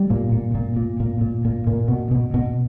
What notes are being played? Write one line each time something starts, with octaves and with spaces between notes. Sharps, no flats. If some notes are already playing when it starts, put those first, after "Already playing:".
Already playing: G3
A#2
A#2
A#2
A#2
A#2
A#2
A#2
A#2
B2
B2
B2